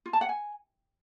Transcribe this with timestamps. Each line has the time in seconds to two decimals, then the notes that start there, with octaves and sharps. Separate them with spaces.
0.06 F4
0.13 A5
0.21 F#5
0.29 G#5